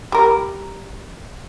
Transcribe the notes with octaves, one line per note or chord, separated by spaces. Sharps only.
G3 A#4